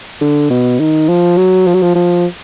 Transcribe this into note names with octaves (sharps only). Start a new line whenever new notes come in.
D3
B2
D#3
F3
F#3
F3
F#3
F3
F3